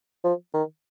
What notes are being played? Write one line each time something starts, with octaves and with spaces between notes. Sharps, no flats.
F3
D#3